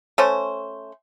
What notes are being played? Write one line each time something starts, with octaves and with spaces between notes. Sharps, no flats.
A3 C#4 C5